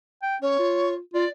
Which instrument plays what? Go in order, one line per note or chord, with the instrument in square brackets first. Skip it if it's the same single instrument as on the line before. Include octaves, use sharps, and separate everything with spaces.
[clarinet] G5
[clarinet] C#4 [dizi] C#5
[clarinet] F4
[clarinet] F4 [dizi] D5